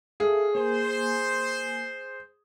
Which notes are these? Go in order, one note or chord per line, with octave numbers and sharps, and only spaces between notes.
G#4 A4 E5 F5
A#3 C5 G#5